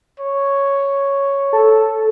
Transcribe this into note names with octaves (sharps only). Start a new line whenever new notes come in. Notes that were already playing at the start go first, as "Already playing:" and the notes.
C#5
A4